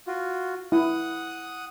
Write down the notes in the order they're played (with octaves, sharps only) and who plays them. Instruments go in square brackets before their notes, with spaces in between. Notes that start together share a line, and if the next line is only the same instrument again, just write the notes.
[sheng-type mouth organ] F4 F#4
[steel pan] E4 [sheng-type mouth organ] F#5 D#6